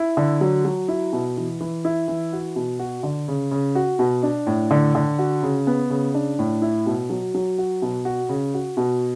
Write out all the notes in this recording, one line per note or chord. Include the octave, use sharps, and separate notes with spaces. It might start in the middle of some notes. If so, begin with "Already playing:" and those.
Already playing: E4
D3
F#3
F#3
E4
B2
E3
E3
E4
E3
F#4
B2
F#4
D3
C#3
C#3
F#4
B2
D4
A2
D3
D3
F#4
C#3
B3
C#3
D4
A2
E4
B2
F#3
F#3
F#4
B2
F#4
C#3
F#4
B2